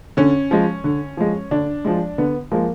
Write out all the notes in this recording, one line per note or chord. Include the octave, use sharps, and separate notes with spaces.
D3 C#4
F3 G#3
D3
F3 G#3
D3 D4
F3 G#3
D3 B3
F3 G#3 A#3